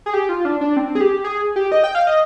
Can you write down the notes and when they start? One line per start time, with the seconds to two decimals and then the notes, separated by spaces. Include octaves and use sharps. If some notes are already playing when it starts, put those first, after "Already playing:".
0.06 G#4
0.13 G4
0.29 F4
0.45 D4
0.61 D4
0.77 C4
0.95 G#4
1.01 G4
1.24 G#4
1.56 G4
1.72 D#5
1.84 G5
1.95 F5
2.07 D#5